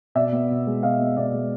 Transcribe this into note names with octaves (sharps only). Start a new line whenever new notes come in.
B2 D5 E5
B3
B2
G#3
B2 D#5 F5
B3
B2 D5 E5
G#3